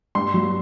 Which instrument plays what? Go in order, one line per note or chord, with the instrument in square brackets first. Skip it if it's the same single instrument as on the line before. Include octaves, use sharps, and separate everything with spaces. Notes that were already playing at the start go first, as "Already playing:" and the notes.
[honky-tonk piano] G2 C6
F#3